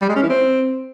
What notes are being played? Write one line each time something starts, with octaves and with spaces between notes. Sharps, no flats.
G3
G#3
C#4
E3
C4